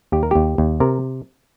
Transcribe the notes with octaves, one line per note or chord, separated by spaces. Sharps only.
D#2 G4
A#4
D#2 G4
D#2
C3 A#4